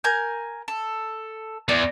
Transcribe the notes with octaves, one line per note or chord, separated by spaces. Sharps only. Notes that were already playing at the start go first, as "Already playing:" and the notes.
A#4 G#5 G6
A4
E2 D5